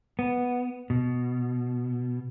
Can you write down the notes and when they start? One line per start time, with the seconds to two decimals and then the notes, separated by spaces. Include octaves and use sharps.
0.19 B3
0.90 B2